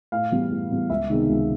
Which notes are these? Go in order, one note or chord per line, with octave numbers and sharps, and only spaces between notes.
A2 F5
E3 G3 B3
A2
E3 G3 B3
C#2 E5
C3 D#3 G#3 B3
C#2